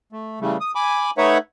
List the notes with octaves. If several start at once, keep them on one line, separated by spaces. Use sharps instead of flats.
A3
C#3 E3 G3 A3
D#6
G#5 B5 D6
A3 D#4 B4 C#5 E5 F#5